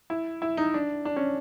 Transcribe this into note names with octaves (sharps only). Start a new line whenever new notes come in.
E4
E4
D#4
D4
D4
C#4